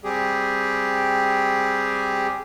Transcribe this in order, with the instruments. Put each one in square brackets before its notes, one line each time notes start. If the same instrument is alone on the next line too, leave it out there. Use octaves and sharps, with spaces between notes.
[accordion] G3 C4 G4 G#4